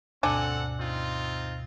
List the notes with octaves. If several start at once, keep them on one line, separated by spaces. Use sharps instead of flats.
D2 G2 B2 C4 D4 A4 F#5 G#5
C4 D#4 F4